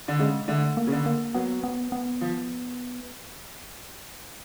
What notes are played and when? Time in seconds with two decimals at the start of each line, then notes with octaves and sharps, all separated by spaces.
0.08 D3
0.19 C#3 G#3
0.48 D3 A3
0.77 A#3
0.87 C#3
0.92 D3
1.06 A#3
1.34 F#3 B3
1.64 B3
1.92 B3
2.21 F3